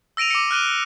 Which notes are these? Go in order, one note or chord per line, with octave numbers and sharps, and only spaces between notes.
E6 A#6 D7 D#7 F7
D6 C#7
F6 F#6 D#7 G7